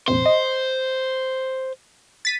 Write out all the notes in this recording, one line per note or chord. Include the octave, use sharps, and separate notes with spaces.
A#1 F2 C3 C5
D#5
A6 B6 D#7